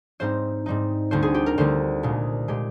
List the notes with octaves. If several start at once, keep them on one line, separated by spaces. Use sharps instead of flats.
G#2 G3 C4 D#4 C5
G#2 G3 C4 D#4
D2 D3 G3 C5
G#4
G4
A#4
D2 D3 G3 C5
C2 A#2 G#3
A#2 G#3 G4